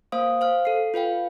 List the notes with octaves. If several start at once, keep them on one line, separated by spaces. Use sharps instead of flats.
A#3 C5 F5 D#6
C5 F5 F6
A4 C7
F4 B4 F5 G5